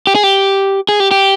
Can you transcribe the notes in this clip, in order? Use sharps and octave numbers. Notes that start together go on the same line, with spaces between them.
G4
G#4
G4
G#4
G4
G4